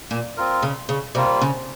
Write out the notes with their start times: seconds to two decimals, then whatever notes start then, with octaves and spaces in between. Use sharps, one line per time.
0.11 A#2
0.37 C4 F4 A#4
0.63 C#3
0.89 C#3
1.15 C3 G3 A#3 F4
1.41 C#3